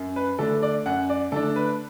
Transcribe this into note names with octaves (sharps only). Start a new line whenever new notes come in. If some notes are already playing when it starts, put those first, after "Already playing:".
Already playing: F#2
B4
D3 A3 D4 A4
D5
F#2 F#5
D5
D3 A3 D4 A4
B4